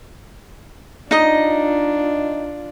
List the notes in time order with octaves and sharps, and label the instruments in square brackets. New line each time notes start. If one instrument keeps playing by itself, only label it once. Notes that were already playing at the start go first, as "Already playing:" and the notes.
[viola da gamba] D4 F4 [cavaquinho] D#4 D#5